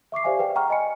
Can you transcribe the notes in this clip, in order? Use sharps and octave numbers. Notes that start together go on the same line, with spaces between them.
E5 C#6 D6 C7
G4 C5 D5 E5 F5 G#5
G#4 B4 D5 G5
F#5 G5 A#5 C#6 F6
D#5 G#5 B5 C#7